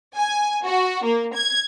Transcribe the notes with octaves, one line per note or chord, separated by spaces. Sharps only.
G#5
F#4
A#3
G#6